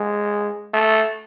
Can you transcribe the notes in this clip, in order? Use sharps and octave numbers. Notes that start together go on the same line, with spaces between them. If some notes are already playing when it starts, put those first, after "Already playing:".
Already playing: G#3
A3